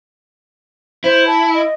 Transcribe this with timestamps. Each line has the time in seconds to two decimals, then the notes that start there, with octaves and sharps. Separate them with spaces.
1.04 E4 C5
1.27 A5
1.54 D#5